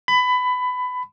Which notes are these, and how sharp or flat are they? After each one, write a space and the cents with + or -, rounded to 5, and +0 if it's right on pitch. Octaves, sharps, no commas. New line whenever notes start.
B5 +20